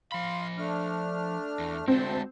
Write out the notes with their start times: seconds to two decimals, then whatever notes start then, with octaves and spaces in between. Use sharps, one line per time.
0.12 F3 F5 B5 C6
0.58 A3 D4 F6
1.59 E2
1.88 D2 G#3 C4 F#4 A5